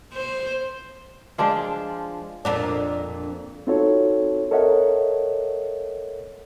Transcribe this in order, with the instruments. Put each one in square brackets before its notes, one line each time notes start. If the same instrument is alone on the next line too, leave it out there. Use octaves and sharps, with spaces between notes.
[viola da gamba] C5
[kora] F3 G#3 D4 F4
[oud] F2 A#2 D4
[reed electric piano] C4 D#4 F4 F#4 A4 C#5
A4 A#4 C#5 D#5 E5 F#5